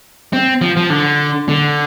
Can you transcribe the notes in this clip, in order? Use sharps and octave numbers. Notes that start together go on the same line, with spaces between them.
C4
F3
F3
D3
D3